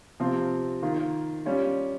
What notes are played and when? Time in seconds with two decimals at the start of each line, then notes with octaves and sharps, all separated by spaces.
0.20 C3 F3 C4 F4
0.82 D#3 A#3 F4
1.46 G3 C#4 F4